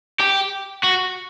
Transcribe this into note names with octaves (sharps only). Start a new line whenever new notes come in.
G4
F#4